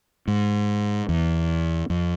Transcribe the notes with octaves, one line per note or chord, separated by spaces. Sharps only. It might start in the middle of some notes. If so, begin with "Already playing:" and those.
G#2
E2
F2